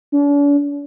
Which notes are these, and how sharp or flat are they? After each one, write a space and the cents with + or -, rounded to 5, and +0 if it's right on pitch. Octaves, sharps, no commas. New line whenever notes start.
D4 -45